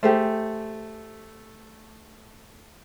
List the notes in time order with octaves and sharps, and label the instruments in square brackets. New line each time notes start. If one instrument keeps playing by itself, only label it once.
[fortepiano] A3 [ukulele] G4 G#4 C5